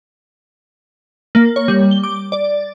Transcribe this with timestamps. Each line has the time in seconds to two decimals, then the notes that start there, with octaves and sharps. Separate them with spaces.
1.35 A#3
1.56 C#5
1.68 G3
1.91 G7
2.03 D6
2.32 D5